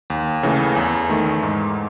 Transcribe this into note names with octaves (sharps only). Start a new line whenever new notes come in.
D#2
C#3 E3 A3
E2
D#3 A3
G#2